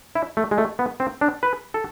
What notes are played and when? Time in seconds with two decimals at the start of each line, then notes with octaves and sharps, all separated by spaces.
0.15 E4
0.37 A3
0.51 G#3
0.58 A3
0.79 B3
1.00 C4
1.21 D4
1.43 B4
1.74 A4